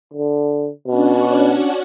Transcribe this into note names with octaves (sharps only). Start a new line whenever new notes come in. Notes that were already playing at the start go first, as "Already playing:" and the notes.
D3
B2 C#4 D4 F#4